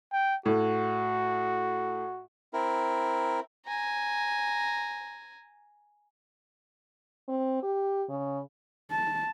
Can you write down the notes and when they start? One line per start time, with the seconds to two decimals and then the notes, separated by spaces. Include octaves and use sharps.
0.12 G5
0.46 A2 F#4
2.54 C4 E4 A#4
3.67 G#5 A#5
7.28 C4
7.63 G4
8.09 C#3
8.91 A5